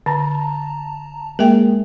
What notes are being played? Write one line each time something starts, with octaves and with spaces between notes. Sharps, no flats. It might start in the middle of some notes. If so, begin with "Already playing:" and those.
D3 A5 A#5
G#3 A#3 G#4 A#4 E5 G5